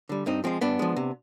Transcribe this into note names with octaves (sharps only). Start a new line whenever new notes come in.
D3 G3
G2 C4 D#4
F3 G#3 C4
G2 B3 D4
F3 G#3
C3